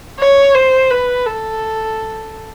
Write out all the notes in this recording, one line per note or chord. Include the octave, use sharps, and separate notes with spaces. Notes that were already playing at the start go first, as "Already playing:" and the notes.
C#5
C5
B4
A4